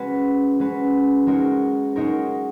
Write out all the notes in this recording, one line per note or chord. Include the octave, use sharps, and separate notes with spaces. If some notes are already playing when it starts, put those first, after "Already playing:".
Already playing: G#3 C#4 F#4 B4
G#3 C#4 F#4 B4
G#3 D#4 F#4 A#4 C#5
G#3 D#4 F#4 A#4 C#5